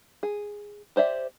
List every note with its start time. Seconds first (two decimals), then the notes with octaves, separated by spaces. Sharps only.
0.23 G#4
0.96 G4 C5 D5 E5